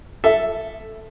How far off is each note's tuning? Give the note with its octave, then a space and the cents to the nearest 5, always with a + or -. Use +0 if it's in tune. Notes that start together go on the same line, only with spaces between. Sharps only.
A4 +0 E5 +0